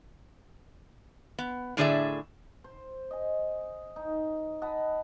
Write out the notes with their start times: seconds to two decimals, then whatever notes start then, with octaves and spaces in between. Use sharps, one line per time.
1.39 B3
1.77 A2 D3 D4 G#4 D5 E5
2.64 C5
3.11 D#5 G#5
3.96 D#4
4.62 D#5 F#5 A5 B5